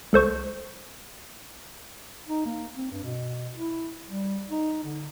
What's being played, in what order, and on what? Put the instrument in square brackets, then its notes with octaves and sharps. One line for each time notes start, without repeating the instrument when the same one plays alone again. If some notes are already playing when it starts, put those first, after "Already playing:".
[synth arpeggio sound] C#2 A4 C5 C#6
[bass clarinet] D#4
A#3
C4
G2
B2
E4
G3
D#4
D3